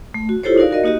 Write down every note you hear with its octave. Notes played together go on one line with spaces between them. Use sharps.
A3
F#4
E4 F4 G4 A4 C5 C#5
D#4 F#4 A#4 D5 F5
F#4 A#4 D#5
A#3 D#4 F#4 G4 D#5